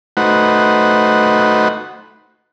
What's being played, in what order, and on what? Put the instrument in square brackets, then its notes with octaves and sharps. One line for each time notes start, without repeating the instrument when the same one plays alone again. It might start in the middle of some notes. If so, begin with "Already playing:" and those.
[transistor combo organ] A3 D#4 F#4 B4 C5 F#5